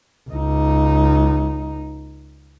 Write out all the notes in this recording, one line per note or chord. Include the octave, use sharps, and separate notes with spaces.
C#2 D#4